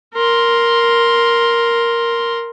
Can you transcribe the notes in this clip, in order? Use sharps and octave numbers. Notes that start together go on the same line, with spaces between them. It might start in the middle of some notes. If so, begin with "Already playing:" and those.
A#4 C6